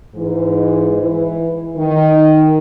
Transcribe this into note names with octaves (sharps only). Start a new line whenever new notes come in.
G#2 E3
E3
D#3